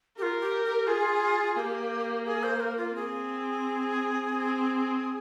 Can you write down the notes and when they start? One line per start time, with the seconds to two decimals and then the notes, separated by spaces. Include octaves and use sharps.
0.18 F4 G4 A#4
0.41 G4
0.64 G4
0.87 F4 G#4
1.56 A#3 G4
2.26 G#4
2.43 C5
2.61 A#4
2.77 F4
2.95 C4 G#4
4.34 C4